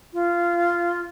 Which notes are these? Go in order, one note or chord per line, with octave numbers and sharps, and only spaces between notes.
F4